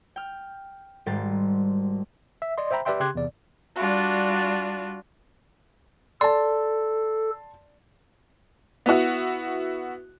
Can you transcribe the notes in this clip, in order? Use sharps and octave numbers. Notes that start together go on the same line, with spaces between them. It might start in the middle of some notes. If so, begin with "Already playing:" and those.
G5 F6
G#1 G#2 G3 C6 A6
E5
D5 D#5 C6
C5 E5 G5 A#5 B5
G4 B4 D5 E5 G5 C6
C#3 G4 C6 F#6 G#6
E2 C3 D5
G3 D4 F4 F#4
A4 D5 A5 C6
B3 E4 F#4